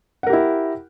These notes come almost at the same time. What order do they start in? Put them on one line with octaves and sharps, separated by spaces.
F#5 A#4 G4 E4